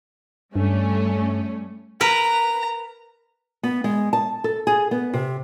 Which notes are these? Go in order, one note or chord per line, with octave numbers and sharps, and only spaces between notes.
G2 G3 A3 C#4
A#4 B4 A#5
B3
G#3
A5
A4
G#4
B3
C3